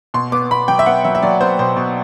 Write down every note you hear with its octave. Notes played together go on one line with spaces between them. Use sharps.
B2 C6
B3 D6
B2 B5
F#3 G5
E5
B3 F#5
F#3 E5
E5
F#3 D5
B3 C5
B2 C5
B2